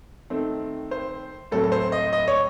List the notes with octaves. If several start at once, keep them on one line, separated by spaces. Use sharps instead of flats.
D#3 A3 C4
C5
A2 F#3 C4 A4
A4
C5
D#5
D#5
C#5